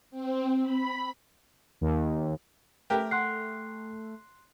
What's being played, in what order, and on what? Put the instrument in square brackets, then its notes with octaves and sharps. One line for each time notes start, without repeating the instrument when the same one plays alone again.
[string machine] C4
B5
[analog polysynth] D#2
[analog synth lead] A3 [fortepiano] G4 A#4 [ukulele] B4 E5 G5
[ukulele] F#5 [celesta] C6 F#6 C7